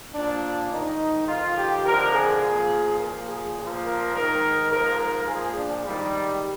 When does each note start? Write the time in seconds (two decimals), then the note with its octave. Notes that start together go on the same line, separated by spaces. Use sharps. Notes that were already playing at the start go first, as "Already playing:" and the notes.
0.15 A#2 F3 D4
0.71 G#2 D#3 D#4
1.28 F2 D#3 F4
1.58 G4
1.86 F2 D3 F3 A#4
2.15 G#4
2.43 A#2 F3
3.00 A#2 F3 A#4
3.29 G#4
3.58 A#2 F3
3.85 A#4
4.14 G#2 D#3 A#4
4.71 G#2 F3 A#4
5.00 A#4
5.28 A#2 F3 G#4
5.57 D4
5.86 G#2 D#3 G3